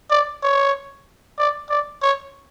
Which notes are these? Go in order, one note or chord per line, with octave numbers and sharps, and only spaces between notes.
D5
C#5
D5
D5
C#5